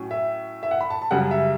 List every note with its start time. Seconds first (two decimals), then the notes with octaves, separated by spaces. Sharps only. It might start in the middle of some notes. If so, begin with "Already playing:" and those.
Already playing: A2 F#3 C#4
0.11 E5
0.63 E5
0.71 F#5
0.81 B5
0.90 A5
1.02 A5
1.11 F#2 C#3 G3 F#5
1.31 E5